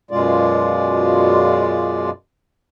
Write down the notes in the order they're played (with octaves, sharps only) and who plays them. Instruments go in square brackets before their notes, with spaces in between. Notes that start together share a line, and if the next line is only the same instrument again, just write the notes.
[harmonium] F#2 B2 G#3 F4 D5